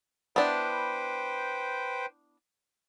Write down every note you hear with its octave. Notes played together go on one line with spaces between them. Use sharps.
B3 D4 E4 B4 C5 G5